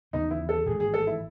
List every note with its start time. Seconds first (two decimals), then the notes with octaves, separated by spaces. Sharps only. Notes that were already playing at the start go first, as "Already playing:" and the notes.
0.13 D#2 C#3 E3 B3 D#4
0.31 E4
0.49 A4
0.66 A1 G#2 D#3 G#3 G#4
0.80 G#4
0.94 A4
1.07 E4